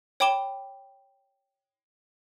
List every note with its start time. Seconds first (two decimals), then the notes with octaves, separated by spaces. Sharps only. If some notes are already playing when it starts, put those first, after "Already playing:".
0.20 C#5 G5 B5 D6 E7 G7